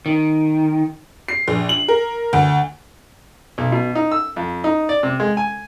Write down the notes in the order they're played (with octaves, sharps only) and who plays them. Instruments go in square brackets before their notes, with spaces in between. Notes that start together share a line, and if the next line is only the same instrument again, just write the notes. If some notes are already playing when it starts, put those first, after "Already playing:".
[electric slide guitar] D#3
[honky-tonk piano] C7
A#1
F#7
A#4
D2
[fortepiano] B1
B2
D#4
E6
F2
D#4
D5
C3
G#3
G#5